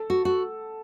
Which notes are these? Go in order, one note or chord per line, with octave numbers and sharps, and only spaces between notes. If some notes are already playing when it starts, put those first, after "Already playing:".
Already playing: A4
F#4
F#4